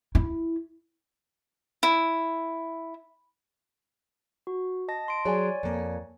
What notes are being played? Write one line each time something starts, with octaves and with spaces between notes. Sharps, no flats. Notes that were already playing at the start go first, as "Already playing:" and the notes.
E4
E4
F#4
D#5 A5 A#6
C6 D7
F#3 G#4 C#5 D5 G#5
F2 A#3